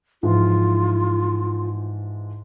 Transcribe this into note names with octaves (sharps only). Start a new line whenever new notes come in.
G#2 E3 F3 F4